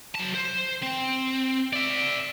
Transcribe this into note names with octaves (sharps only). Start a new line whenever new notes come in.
F#3 A5
C5
C4
D5 E5